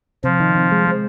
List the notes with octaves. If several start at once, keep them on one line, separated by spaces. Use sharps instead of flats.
C3 F3
D#3
C3
G#3
G#3